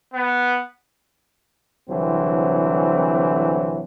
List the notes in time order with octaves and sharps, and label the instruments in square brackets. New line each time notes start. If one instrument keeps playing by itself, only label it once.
[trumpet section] B3
[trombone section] C2 D3 E3 F#3 C4